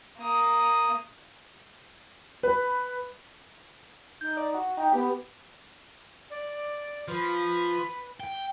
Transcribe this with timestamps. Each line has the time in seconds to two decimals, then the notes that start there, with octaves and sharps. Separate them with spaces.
0.18 A#3 D#6
2.43 B4
4.21 D#4 G6
4.37 D5
4.54 F#4
4.77 D#4 G5
4.93 B3 G4
6.30 D5
7.08 F3 B4
8.20 G5